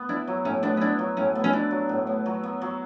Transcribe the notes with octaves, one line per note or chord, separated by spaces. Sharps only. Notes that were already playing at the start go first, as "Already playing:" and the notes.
Already playing: B3
D4 E4
F#3
A2 C#4
B3 D4
C#4
D4 E4
F#3
A2 C#4
B3
C#4
D4 E4
F#3
A2
B3
F#3
B3
F#3